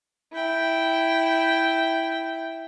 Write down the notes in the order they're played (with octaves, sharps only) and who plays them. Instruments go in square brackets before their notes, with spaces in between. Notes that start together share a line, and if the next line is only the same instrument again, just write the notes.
[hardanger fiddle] E4 G5